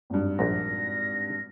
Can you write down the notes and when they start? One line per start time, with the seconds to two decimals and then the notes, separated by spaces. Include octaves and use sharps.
0.10 G#1 G2
0.39 A#1 G#2 A#6